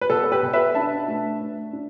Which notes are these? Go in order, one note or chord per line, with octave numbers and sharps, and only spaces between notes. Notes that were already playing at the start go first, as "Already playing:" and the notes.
B4
B2 A4
A4
G4 B4
B2
B4 E5
D4 E5 A5
A3
A3
D4